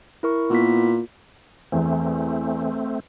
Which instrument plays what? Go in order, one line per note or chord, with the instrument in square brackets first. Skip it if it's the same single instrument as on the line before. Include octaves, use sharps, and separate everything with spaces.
[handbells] E4 A#4 C#6
[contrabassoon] A#2 [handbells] B3 E4 B6
[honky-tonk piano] E2 [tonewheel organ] A3 C4